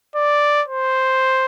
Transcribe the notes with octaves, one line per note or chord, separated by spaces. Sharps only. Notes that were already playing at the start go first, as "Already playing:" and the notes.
D5
C5